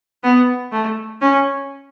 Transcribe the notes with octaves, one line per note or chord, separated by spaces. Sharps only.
B3
A3
C#4